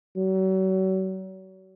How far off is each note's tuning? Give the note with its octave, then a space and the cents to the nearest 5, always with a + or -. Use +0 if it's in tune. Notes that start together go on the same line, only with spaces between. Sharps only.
F#3 +40